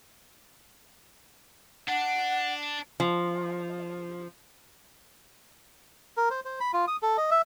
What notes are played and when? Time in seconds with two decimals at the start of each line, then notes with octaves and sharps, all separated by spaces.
1.88 D4 F#5
3.00 F3
6.17 A#4
6.30 C5
6.45 C5
6.60 B5
6.73 F4
6.88 D#6
7.02 A4
7.17 D#5
7.31 E5